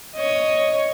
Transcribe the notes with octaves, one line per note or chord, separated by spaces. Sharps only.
C#5 D#5